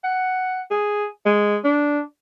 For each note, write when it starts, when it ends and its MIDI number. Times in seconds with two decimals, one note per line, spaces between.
0.04 0.61 78
0.71 1.06 68
1.26 1.58 56
1.65 2.01 62